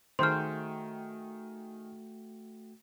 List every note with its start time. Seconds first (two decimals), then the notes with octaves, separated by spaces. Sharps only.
0.19 D#3 A3 F#4 G#4 C5 G5 C6 F6